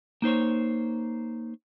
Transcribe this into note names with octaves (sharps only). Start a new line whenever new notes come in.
A#3 D#4 C5 C#5